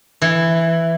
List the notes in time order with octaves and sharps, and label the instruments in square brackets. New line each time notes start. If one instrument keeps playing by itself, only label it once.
[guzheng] E3